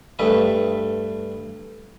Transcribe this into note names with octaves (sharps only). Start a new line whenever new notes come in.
G2 A3 B4 D#6